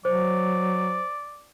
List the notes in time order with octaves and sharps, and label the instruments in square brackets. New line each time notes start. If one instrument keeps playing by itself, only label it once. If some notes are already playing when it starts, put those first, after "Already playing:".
[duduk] F#3 [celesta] C5 [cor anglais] D5